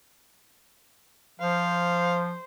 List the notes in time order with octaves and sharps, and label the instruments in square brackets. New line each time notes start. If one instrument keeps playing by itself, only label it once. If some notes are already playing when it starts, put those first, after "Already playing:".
[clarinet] F3 [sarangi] C5 [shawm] F5